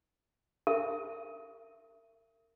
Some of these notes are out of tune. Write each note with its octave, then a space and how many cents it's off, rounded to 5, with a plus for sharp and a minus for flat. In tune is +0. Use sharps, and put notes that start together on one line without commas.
A#4 -30 E5 +25